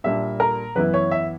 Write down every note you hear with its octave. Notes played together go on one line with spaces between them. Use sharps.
A#2 G3 A#3 D4 E5
A#4
F#2 E3 B3 E4 B4
C#5
E5